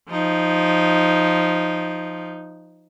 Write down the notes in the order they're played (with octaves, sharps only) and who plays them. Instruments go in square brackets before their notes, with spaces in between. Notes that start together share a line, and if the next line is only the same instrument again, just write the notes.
[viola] F3 D#4